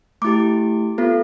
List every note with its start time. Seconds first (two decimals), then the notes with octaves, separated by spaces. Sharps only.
0.22 A3 E4 G4 D6
0.98 B3 F4 A4